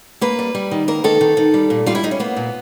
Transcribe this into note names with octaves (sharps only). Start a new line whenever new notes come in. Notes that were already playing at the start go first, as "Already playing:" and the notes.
A#3 B4
G3
G3
D#3
A#3 A#4
D#3 A4
D#3
D#3
G3
A#2
G3 F4
E4
G3 D#4
C#4
A#3 B3
A#2